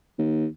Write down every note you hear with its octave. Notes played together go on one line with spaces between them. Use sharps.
D#2